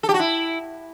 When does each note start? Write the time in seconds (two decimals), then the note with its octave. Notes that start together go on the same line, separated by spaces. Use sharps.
0.03 A4
0.09 G4
0.14 F#4
0.19 E4